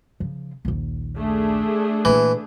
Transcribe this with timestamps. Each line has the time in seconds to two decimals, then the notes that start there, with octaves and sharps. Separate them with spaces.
0.20 C#3 F3
0.65 A#1 D#2
1.16 A3 D4 G#4
2.05 A#2 E3 A#3